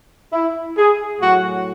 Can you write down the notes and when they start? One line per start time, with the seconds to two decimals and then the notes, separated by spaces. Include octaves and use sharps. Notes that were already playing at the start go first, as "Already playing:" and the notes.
0.33 E4
0.78 G#4
1.21 A2 F#3 F#4